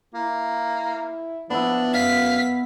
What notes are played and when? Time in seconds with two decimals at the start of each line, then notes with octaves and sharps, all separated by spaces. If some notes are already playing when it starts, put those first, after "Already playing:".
0.14 A#3 E4
1.50 F3 B3 D4 E4
1.94 F#2 F5 B6